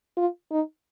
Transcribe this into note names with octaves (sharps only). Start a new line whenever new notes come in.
F4
D#4